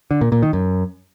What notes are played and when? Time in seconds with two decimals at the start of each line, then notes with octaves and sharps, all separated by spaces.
0.11 D3
0.21 A#2
0.32 A#2
0.43 D#3
0.53 F#2